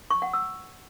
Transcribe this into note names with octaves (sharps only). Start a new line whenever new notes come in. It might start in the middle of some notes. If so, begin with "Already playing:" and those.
C#6
F#5
E6